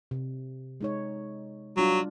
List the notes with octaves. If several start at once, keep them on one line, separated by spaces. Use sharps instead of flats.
C3
G#3 D#4 C#5
F#3 G3 D4 F4